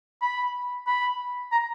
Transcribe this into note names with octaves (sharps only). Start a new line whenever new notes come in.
B5
B5
A#5